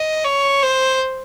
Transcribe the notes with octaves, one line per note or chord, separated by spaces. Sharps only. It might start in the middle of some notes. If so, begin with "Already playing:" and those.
Already playing: D#5
C#5
C5